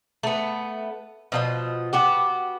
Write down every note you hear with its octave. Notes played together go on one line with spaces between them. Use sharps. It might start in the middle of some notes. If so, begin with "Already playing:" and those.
A3 B3
B2 F3 D#5
B3 F#4 G4